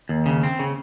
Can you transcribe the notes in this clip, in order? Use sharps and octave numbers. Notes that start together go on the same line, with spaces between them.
D#2
C#3
C4
C#3